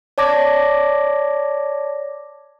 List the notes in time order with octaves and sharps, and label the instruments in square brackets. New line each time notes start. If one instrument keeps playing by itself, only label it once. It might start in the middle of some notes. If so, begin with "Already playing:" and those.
[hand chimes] C#5 D5 A5 D6 G#6 A#6